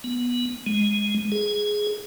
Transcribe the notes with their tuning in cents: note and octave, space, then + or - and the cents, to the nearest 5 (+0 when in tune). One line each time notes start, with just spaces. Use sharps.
B3 -15
G#3 -5
G#4 +5